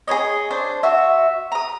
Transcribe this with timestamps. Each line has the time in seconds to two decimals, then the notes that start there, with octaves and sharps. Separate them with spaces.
0.08 G#4 C5 C#5 D#5
0.51 D4 C5
0.83 F#4 E5
1.52 A#5 D#6